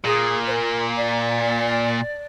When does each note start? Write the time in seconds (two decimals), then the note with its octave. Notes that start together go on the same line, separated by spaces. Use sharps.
0.04 A#2 G#4
0.46 C5
0.51 A#4
0.97 D5